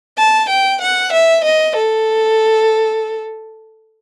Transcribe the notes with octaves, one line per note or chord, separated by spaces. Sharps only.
A5
G5
F#5
E5
D#5
A4